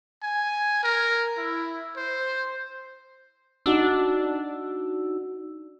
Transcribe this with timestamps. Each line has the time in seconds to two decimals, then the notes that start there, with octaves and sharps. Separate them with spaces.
0.23 G#5
0.83 A#4
1.37 E4
1.97 C5
3.66 D4 D#4 F#4 E6